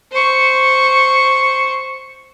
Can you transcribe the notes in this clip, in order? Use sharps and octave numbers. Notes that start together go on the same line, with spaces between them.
C5 C#6